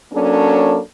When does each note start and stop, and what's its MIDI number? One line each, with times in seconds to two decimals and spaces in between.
0.13 0.79 54
0.13 0.79 58
0.13 0.79 61
0.13 0.79 62
0.13 0.79 69